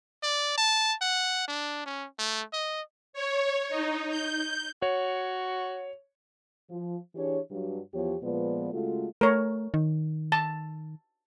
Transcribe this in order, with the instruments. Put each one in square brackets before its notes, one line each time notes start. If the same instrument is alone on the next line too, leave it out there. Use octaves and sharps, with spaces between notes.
[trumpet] D5
A5
F#5
D4
C#4
A3
D#5
[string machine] C#5
D#4
G6
[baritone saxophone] F#4 [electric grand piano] C#5
[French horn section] F3
E3 D4 G4 G#4 C#5
G2 F#3
E2 F3 B3 G4 C#5
A#2 F3 G#3 B3 B4 D5
C#3 G#3 A3 F4 F#4 A4
[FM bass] A3 [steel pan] A#4 C#5
[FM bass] D#3
[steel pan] A5